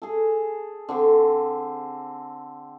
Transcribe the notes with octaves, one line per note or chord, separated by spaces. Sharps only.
G#4 A4
D3 C4 C#6